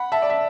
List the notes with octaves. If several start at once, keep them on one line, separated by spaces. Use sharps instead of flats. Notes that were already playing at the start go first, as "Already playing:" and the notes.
Already playing: F#5 B5
E5 A5
D5
E5